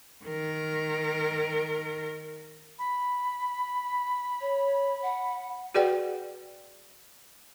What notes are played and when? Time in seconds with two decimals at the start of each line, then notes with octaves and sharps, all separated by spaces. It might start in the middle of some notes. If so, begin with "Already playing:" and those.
0.25 D#3 A#4
2.79 B5
4.41 C#5
5.02 F#5
5.75 F#4 G#4 B4 D5 F#5 G5